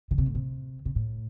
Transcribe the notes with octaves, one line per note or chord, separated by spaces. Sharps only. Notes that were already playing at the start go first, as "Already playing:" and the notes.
D3
C3
A2
C3
C3
A2